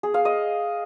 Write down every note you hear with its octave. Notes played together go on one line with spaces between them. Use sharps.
G#4
F5
D#5